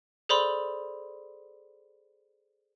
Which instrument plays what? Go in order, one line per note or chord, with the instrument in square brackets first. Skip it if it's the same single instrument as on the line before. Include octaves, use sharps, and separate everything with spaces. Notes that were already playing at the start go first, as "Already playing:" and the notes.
[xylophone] G#4 A4 C5 D5 B5 C6